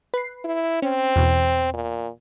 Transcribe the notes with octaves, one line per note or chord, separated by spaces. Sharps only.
B4 C7
E4
C4 C#4
E2 B2
A#2